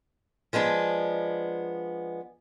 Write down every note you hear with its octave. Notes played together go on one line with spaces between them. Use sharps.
F3 G#3 B3 D4